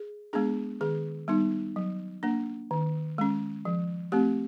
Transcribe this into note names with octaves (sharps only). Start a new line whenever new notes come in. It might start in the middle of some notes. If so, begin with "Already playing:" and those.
Already playing: G#4
G#3 B3 D4 G#4
D#3 G#4
G3 B3 D#4
F#3
A#3 D4
D#3
G#3 C#4
F3
A3 C4 G4